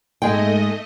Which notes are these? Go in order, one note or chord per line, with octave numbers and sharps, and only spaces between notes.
G#2 G#3 A3 D#5 G5